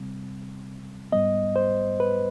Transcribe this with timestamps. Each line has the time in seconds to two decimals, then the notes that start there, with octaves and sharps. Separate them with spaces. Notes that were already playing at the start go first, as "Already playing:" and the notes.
Already playing: C3 G3 C4
1.12 G#2 G3 B3 D#5
1.56 C5
2.00 B4